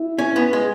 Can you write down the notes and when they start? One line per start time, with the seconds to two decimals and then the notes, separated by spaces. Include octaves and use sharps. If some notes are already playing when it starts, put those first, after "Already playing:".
Already playing: E4
0.19 C#4
0.36 B3
0.53 G#3